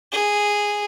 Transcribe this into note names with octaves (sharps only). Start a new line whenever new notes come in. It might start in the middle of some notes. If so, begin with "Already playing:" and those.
G#4